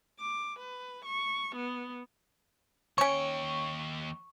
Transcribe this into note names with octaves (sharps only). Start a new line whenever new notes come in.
D6
B4
C#6
B3
D#2 C#4 C#5 G5 C#6